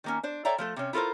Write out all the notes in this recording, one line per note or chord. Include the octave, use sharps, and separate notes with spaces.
D#3 A#3 C#4
D4 C5
A4 C#5 D5 E5 G5 A#5
F3 A3 A4
C3 C#4
E4 F4 A4 A#4 C5